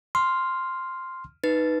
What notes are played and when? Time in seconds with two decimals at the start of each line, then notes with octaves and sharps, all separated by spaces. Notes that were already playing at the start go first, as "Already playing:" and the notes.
0.15 C6 F6
1.44 D#4 B4 A6